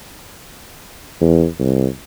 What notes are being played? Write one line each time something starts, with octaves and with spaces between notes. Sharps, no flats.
E2
C2